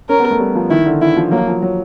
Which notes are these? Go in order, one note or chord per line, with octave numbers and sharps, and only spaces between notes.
C#4 A#4
B3
A3
G3
F3
D#3 E4
D3
E3 E4
F3
F#3 A#3
F3
F#3